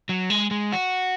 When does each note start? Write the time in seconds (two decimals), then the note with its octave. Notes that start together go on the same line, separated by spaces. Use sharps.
0.09 F#3
0.30 G#3
0.51 G#3
0.72 F#4